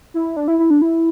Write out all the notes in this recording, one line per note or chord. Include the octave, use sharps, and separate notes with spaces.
E4
D4
E4
E4
D4
E4